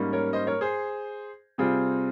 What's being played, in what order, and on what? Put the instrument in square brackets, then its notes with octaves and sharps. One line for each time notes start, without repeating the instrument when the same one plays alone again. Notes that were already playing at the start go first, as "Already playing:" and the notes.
Already playing: [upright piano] G#2 G3 A#3 C#4
A#4 C#5
C5 D#5
A#4 C#5
G#4 C5
C3 G3 C4 F4 G#4